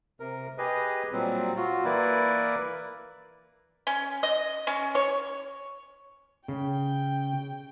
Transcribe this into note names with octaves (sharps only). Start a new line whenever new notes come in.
C3 A#4
G4 G#4 B4 D#5
A#2 F#3 G3 C4
F4 F#4
E3 A#3 E4 A#4 B4 D5
C#4
D#5
C#4
C#5
C#3 G5